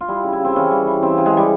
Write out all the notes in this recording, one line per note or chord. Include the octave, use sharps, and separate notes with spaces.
F4
G3 E4
C#3
E4
C#3 C4
E3 C#4
G3
E3
C#3 C4
C#3
G#3
E3 G3